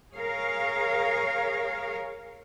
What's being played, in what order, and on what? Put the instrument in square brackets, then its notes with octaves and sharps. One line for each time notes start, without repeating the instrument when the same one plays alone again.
[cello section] G#4 A#4 C#5 F5